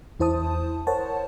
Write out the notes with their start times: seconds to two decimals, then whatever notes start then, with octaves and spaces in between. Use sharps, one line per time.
0.20 E2 E4 C5 A5 D#6
0.87 A#4 C5 C#5 F#5 A5